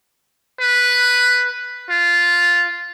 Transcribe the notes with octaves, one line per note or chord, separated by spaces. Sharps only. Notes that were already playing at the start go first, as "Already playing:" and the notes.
B4
F4